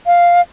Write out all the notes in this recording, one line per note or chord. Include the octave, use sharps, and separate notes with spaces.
F5